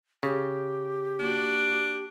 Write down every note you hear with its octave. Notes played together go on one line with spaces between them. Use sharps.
C#3 G4
A#3 D4 F#4